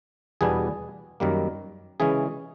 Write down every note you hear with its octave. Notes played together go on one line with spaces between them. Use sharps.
E2 B2 G3 B3 D4 G#4
F#2 D#3 G3 A#3
C#3 E3 G#3 C#4 G#4